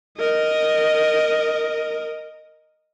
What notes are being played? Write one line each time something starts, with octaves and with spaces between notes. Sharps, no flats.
A#4 D#5